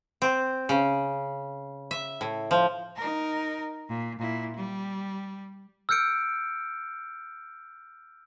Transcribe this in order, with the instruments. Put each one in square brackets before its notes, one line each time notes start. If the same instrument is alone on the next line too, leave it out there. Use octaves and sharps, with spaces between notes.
[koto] C4
C#3
E5
A2
F3
[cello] D#4 A#4
A#2
A#2 E4
G3
[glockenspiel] E6 F6 G6 C#7 D7